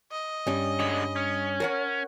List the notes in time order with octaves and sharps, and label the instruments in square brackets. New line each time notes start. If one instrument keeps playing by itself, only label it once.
[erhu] D#5
[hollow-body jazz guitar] G2 G3 [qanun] C#4
[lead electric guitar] D3 G#3 [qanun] B5
[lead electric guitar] C#4
[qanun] A#4 C#5 F#5